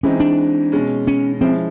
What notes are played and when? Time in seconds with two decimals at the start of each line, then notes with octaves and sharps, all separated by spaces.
0.03 E3 G#3 C4 C#4 D#4
0.20 D4
0.72 B2 G#3 C#4
1.07 C#4
1.41 F3 G#3 C4 C#4 E4